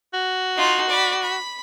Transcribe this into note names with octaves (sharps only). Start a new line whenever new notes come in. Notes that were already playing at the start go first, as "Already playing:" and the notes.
F#4
D#4 F4
D5 B5
B5